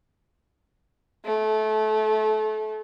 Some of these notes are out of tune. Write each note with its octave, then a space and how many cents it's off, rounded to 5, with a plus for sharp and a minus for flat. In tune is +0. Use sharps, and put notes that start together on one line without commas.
A3 -25